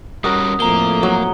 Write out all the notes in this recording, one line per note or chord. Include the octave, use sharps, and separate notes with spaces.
G3 C#4 F#4 A#4 D#6
F2 A2 A#3 A#5 G7
F#3